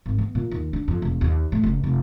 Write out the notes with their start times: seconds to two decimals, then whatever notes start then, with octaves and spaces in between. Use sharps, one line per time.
0.06 G#1
0.18 B3
0.35 A#2
0.51 D#2
0.73 D4
0.88 F2
1.02 E1
1.21 D#2
1.52 A2
1.63 F#1
1.84 F1